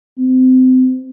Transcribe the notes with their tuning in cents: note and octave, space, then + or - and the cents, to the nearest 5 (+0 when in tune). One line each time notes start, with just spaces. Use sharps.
C4 -30